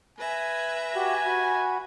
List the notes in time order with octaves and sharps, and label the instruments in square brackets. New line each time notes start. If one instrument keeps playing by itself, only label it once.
[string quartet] B4 E5 A#6 [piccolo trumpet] G#5
[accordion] F#4 G4 [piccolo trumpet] G#5
[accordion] F#4 B5